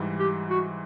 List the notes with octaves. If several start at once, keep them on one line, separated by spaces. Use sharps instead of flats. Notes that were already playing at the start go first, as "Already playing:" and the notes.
Already playing: G#2 E3 G3
G4
F#4